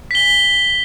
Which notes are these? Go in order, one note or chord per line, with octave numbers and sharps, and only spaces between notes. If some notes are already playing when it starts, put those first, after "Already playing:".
B6 G7